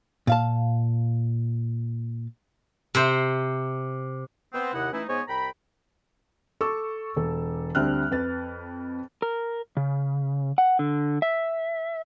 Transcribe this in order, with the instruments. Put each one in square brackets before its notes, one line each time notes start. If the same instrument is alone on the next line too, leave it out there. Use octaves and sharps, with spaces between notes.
[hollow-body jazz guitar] A#2 F5 A5
[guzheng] C3 C5
[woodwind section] B3 C4
D#2 C3 E4 D#5 F#5
E3 A3 C#4 D#4 E4
G#2 B3 C5 C#5 D#5 G#5
C2 G5 A#5 B5
[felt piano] A4 C#6 D6 E6
E1 A4
D2 G3 C4 D4 F6 F#6
F2 B4 A6
[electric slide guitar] A#4
C#3
F#5
D3
E5